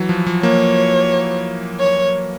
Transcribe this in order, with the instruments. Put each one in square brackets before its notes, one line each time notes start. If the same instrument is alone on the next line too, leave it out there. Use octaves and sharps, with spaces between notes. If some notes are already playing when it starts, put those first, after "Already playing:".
Already playing: [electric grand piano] E3 F#3
F3
F3
[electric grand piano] A#3 [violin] C#5
[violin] C#5